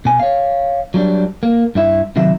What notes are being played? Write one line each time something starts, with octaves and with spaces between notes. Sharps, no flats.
B2 G#5
C#5 F5
F#3 G3 D4
A#3
G2 E4 E5
C3 D#3 F#3 E5